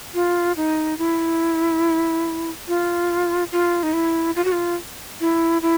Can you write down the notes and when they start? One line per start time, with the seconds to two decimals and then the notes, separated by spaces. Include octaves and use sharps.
0.14 F4
0.57 D#4
0.98 E4
2.68 F4
3.52 F4
3.83 D#4
3.93 E4
4.36 F4
4.45 F#4
4.52 F4
5.21 E4
5.62 E4